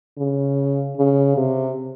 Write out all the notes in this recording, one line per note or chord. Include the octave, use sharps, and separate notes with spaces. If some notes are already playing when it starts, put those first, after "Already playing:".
C#3
C#3
C3